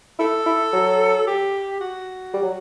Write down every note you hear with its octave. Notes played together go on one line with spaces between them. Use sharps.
E4 A4
E4
F#3
G4
F#4
G3
F#3